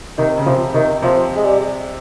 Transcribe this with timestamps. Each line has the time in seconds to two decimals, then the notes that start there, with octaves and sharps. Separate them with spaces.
0.18 C3 D#3
0.38 C#3
0.46 C3 F3
0.74 C3 D#3
1.02 C3 F3
1.36 G#3
1.45 G3